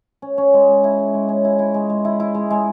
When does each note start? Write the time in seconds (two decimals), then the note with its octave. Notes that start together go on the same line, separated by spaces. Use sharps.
0.22 C#4
0.38 C#4
0.54 G#3
0.68 G#3
0.84 E4
0.99 G#3
1.14 G#3
1.29 C#4
1.45 E4
1.59 E4
1.74 G#3
1.90 G#3
2.05 E4
2.20 E4
2.35 G#3
2.51 G#3